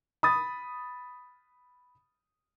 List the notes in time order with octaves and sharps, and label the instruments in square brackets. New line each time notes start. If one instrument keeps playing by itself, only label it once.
[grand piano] B5 D#6 A6